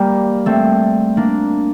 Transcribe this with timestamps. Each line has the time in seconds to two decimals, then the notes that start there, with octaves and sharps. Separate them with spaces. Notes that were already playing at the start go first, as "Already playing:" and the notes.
Already playing: G3 A#3
0.46 A3 C4
1.17 A#3 D4